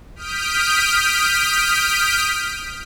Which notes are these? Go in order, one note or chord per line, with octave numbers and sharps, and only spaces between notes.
D#6 F6 G6 B6 D7